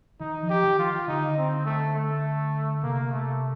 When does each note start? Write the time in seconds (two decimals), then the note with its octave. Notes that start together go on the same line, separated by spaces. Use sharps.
0.20 D#3 D#4
0.43 F3
0.50 G4
0.64 D#3
0.79 F4
1.08 D3 D#4
1.37 C4
1.66 A3
1.95 A3
2.83 C3 A#3
3.11 A3